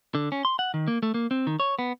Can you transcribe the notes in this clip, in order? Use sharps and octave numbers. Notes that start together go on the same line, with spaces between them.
D3
C#4
C6
F#5
D#3
A#3
A3
A#3
C4
D#3
C#5
B3